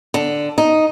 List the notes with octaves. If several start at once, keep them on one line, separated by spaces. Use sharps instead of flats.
D3
D#4